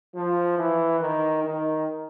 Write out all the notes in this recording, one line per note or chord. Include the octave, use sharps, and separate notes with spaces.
F3
E3
D#3
D#3